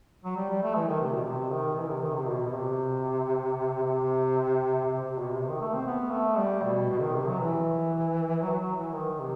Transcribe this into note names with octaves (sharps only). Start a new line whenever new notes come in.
F#3
G3
G3
A3
E3
D#3
C3
B2
C3
D#3
E3
C3
D#3
C3
B2
B2
C3
C3
C3
C3
B2
C3
D#3
A3
C4
B3
A3
G3
B2
B2
D#3
C3
F#3
E3
F#3
F#3
E3
D#3
C3